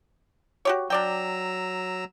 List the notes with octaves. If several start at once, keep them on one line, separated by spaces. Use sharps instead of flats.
F#4 G4 C#5
F#3 D4 D5 G5 A#5 E6